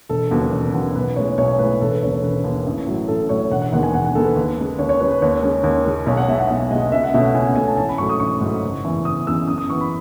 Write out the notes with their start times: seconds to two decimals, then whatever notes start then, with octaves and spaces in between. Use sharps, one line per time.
0.09 E1 A4
0.31 D#2 C#3 F#3 B3
0.52 E1
0.73 D#2 C#3 F#3 B3
0.95 B1 B4
1.16 A2 G#3 C#4 C#5
1.38 B1 C#5
1.59 A2 G#3 C#4 B4
1.81 E1 A4
1.91 B4
2.02 D#2 C#3 C#5
2.12 A4
2.23 E1 B4
2.44 D#2 C#3
2.66 A1
2.87 A2 F#3
3.08 A1 A4
3.29 A2 F#3 C#5
3.50 E1 F#5
3.62 F#5
3.72 D#2 D#3 G#3 B3 F#5
3.83 G#5
3.94 E1 F#5
4.05 F#5
4.15 D#2 D#3 G#3 B3 A4
4.25 B4
4.36 D#2
4.58 C#3 G#3
4.79 D#2 C#5
4.89 C#5
5.00 C#3 G#3 B4
5.11 B4
5.22 D#2 C#5
5.42 C#3 G#3 C#4
5.64 D#2
5.85 C#3 G#3 C#4
6.06 B1 C#5
6.17 F#5
6.28 B2 G#3 E5
6.39 F#5
6.50 B1 E5
6.71 B2 G#3 D#5
6.92 C#2 E5
7.03 F#5
7.14 B2 A3 C#4 E5
7.24 F#5
7.34 C#2 G#5
7.45 F#5
7.56 B2 A3 C#4 G#5
7.67 A5
7.77 A1 A5
7.89 B5
7.98 G#2 F#3 A3 C#6
8.09 D#6
8.20 A1 C#6
8.41 G#2 F#3 A3
8.62 F#1
8.84 E2 C#3 E3
9.05 F#1 D#6
9.27 E2 C#3 E3 E6
9.48 F#2 D#6
9.58 D#6
9.69 E3 B3 C#6
9.80 B5